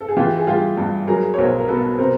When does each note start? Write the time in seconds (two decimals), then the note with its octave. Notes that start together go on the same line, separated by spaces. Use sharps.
0.01 A4
0.08 G#4
0.17 E3 F4 G4
0.39 G#4
0.47 G3 F4 G4
0.77 G2
1.07 F#3 G#4 A#4
1.34 C#5
1.38 B1 A#4 C5
1.59 A#4
1.68 B2 A4 B4
1.98 C3 A#4 C5